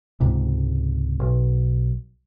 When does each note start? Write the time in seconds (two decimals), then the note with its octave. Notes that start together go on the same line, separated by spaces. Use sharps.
0.20 C#2 G#2 C3
1.20 B1